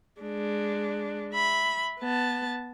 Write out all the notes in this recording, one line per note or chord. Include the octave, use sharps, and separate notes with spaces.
G#3 D4
E5 B5
B3 A5